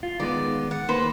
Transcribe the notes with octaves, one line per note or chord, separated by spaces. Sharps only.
F4
D#3 G#3 B3 D5
F#5
D#3 A#3 B4 C5